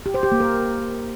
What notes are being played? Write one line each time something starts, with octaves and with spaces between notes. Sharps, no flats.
G4
C5
G4
A#3
A#4